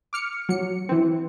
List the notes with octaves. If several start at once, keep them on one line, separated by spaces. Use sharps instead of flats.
D6 F6 C#7
F#3 C#7
E3 C4